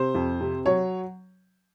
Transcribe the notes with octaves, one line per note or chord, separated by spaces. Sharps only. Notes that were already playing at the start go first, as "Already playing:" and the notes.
Already playing: C3 C5
F2
C3
F#3 C#5